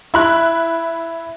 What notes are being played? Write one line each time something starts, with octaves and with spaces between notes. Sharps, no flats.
E4 B5 F#6